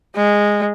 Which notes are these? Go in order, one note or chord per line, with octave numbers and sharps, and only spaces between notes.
G#3